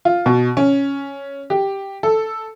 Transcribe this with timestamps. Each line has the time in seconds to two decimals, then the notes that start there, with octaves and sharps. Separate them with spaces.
0.05 F4
0.26 B2
0.57 C#4
1.50 G4
2.03 A4